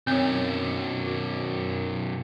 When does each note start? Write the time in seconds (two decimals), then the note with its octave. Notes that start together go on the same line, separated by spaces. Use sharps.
0.07 B1 F#2 C4 C#5
1.07 F#4